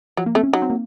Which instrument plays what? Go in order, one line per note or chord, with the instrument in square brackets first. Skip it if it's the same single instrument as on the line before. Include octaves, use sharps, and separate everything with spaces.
[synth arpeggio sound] F3 [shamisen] F#3
[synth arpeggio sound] A#3
[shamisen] A3 [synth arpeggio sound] C4
[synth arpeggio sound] C#4
[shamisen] F#3 [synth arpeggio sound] D#4
[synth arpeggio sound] C4
A#3